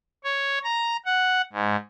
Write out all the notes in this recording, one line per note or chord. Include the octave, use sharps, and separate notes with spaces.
C#5
A#5
F#5
G#2